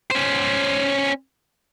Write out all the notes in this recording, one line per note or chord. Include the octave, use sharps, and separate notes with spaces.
C#4 C5